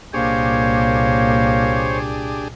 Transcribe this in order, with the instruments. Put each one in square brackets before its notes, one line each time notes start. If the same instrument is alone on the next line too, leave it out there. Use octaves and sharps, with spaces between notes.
[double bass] C2 A#2 [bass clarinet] A#3 [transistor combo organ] D4 G4 G#4 [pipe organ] C5 C#5